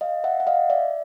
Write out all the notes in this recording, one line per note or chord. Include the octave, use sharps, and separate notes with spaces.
D#5 F5
E5 F#5
F#5
D#5 F5
D5 E5